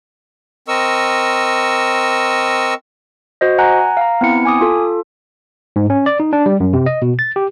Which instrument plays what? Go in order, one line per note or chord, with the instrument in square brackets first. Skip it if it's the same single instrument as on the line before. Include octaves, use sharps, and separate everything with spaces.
[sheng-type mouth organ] C4 A#4 D#5 C#6 E6
[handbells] F#4 C5 D#5
F#5 G#5 A#5 F#6
F5 A#5
B3 C4 E4 C#7
G#5 D6 D#6
F4 A4
[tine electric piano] G#2
C#4
D5
D#4
D4
G3
F#2
C3
D#5
B2
A6
G4